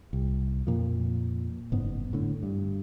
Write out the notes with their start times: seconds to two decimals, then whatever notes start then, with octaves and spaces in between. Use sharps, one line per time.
0.13 C2
0.67 F2 A#2 F3
1.72 F#1 G#2 B3
2.13 A2 D3
2.43 G2